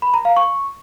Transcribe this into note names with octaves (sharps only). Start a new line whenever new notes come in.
B5
A#5
F5
C#6